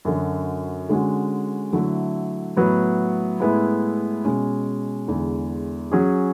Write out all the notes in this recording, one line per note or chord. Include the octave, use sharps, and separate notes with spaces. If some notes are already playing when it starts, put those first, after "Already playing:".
F#2 D3 F#3
D3 G#3 C#4 F#4
D3 F#3 A3 E4
A2 F#3 B3
A2 G#3 B3 E4
B2 G#3 C#4
E2 D3 G#3
F#3 C#4 G#4